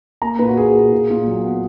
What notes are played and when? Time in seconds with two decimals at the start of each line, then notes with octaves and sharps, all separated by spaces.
0.22 A#3 A#5
0.39 A#2 B4
0.48 F#4
0.56 A#3 G#4
0.74 A#2
0.92 A#2
1.10 A#2
1.27 F#3
1.44 B3